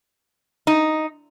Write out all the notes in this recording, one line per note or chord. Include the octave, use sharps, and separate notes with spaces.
D#4